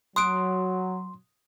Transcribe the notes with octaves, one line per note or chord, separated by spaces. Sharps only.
F#3 C6 D#6 F#6 D7